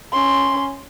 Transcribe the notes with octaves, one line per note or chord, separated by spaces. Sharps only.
C#4 C6